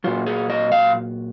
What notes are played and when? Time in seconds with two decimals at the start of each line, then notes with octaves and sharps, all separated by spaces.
0.04 A#2 F#3 F4
0.26 G#4
0.50 D#5
0.72 F5